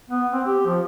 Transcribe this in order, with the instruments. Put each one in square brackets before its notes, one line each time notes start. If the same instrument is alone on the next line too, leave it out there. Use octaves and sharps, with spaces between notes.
[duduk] B3
C4
G4
F3